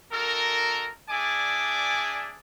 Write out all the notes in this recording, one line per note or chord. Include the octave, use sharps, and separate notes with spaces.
D#4 F#4 A4 A#4
D4 G#4 D5 E5 G#5 D6